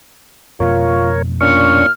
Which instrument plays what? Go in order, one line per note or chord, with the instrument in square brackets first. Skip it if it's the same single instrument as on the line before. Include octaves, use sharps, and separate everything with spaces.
[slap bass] F2 B2 A3 [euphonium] F4 [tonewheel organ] A#4 C#5
[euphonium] A#2 [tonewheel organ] C#4 D4 C#6 [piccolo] F6